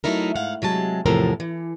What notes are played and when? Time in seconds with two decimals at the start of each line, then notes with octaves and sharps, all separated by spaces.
0.04 F#3 A3 D#4 E4 A#4
0.36 G#2 F5 F#5
0.62 C3 F#3 G#3 A5
1.06 E2 A2 C3 F3 A4 A#4
1.40 E3